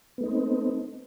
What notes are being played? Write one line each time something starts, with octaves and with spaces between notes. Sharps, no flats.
A3 B3 C4 D#4